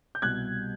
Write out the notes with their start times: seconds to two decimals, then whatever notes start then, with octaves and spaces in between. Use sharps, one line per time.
0.15 G6
0.22 C2 B2 G3 F#6 G#6